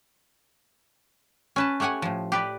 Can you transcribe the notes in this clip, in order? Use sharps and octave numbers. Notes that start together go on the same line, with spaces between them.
C#4 B4 A5
A3 G4 C#5 F#5 G#5
A2 F3
G4 B4 D5